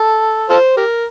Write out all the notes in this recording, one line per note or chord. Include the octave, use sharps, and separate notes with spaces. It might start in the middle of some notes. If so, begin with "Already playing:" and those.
Already playing: A4
F4 A4 C5
G4 A#4